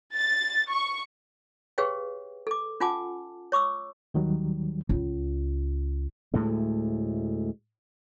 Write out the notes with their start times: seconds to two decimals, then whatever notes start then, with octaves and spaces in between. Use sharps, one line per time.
0.15 A6
0.70 C#6
1.78 G4 G#4 B4 C#5 F5 G5
2.47 A4 D6
2.80 C#4 F4 F#5 G#5 A5 D6
3.52 C#5 C#6 D6 E6
4.14 D#2 D#3 F#3 G3
4.89 C#2
6.34 D2 A2 G#3 A3